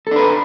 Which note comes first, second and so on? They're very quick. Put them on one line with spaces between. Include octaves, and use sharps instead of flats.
A4 D4 B4